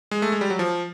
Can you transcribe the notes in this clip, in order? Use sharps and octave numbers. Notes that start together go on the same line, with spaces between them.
G#3
A3
G#3
G3
F#3
F3